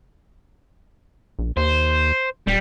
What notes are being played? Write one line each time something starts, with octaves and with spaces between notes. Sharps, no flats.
A#1
D#2 C5
D#1 G3